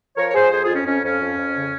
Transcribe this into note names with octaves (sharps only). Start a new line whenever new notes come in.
F3 A#4 C#5
C#5
F3 G#4 C5
F2 G#4 C5
F4 G#4
F2
C#4
F2 C#4
F2 C#4
F2
F2
C#3